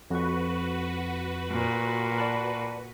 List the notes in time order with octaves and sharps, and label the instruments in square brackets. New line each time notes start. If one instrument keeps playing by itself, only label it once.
[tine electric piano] F2 C#6 [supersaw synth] F#4 B4
[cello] A#2
[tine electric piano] D5 A5 B5